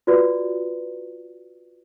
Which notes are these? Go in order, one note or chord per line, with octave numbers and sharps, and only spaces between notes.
F4 F#4 B4 D5